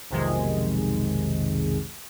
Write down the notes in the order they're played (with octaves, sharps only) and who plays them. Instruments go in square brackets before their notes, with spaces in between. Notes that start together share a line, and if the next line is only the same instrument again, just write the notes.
[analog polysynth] B1 F2 C3 D#3 G#3